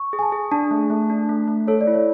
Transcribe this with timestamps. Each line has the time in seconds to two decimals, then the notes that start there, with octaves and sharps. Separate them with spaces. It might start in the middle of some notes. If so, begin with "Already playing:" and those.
Already playing: C#6
0.13 G#4
0.19 G#5
0.23 A5
0.32 G#4
0.52 D4 A5
0.71 A3
0.90 A3
1.10 D4
1.29 A3
1.48 A3
1.67 A4 C#5
1.81 D5
1.87 E4
1.95 C#5